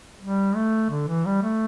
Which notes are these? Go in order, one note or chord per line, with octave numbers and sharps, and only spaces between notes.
G3
A3
D3
E3
G3
A3